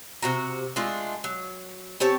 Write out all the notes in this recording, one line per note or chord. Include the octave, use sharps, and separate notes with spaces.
C3 F#4 A#5
G#3 A3 D4 F4
F#3
C4 G4 C#5 A5